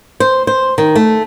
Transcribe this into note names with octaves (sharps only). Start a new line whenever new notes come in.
C5
C5
D#3
A3